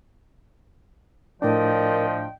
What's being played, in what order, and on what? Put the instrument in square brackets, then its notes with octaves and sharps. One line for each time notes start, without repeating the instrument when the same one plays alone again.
[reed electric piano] A2 D4 [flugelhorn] F3 [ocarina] A#4 [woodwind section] D5 D#5 G5